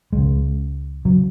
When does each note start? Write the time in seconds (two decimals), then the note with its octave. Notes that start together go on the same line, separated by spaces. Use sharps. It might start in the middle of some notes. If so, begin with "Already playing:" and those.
0.13 C#2 C#3 G#3
1.05 C#3 F#3